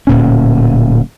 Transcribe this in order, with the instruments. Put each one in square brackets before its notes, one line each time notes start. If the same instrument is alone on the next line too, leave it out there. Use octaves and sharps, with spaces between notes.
[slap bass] D1 A#2 C#4